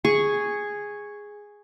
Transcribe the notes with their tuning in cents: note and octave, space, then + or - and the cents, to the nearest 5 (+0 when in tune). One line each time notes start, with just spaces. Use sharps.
G#4 -5 C#6 +0